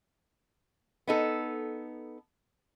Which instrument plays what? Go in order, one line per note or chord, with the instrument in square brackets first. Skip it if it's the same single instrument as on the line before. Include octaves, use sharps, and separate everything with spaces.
[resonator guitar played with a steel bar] B3 D#4 A4